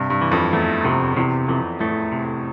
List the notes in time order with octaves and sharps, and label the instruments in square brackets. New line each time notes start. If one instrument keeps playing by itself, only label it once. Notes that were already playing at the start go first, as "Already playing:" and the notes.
Already playing: [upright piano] G2 [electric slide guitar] C3
[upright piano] G2
[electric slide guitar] E3
[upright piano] F2
[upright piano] E2 [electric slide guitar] A3
[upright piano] F2 [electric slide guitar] C3
[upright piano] E2 [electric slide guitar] C3
[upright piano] F2 [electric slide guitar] E3
[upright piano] A2 [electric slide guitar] A3
[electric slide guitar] C3